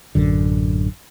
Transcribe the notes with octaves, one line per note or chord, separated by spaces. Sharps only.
A1 F#2 D3